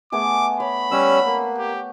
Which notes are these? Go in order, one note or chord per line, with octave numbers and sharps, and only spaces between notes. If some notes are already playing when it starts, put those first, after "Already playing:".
A3 B3 G#4 D6
C#5 B5
G3 C#4 C#5 F#5 D6 E6
A#3
G4